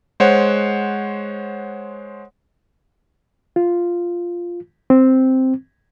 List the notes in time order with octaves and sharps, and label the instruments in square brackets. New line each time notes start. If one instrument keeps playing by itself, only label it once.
[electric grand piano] G#3 C5 C#5 F#5
[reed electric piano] F4
C4